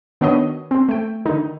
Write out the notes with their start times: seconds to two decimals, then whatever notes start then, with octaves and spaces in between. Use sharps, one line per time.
0.21 D#3 B3 D4 F#4 C#5 D#5
0.71 C4
0.89 A3 G5
1.25 D3 D#3 D#4